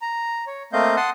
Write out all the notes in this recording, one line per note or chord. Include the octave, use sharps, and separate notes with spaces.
A#5
C#5
A3 A#3 C4 D#5 F5 G6
F#5 A5 C6 D#6